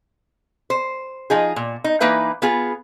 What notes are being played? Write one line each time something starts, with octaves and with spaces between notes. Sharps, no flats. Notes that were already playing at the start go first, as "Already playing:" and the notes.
C5
F3 D#4 G#4
A#2
D#4
E3 A#3 D#4 B4 E5
B3 F4 G#4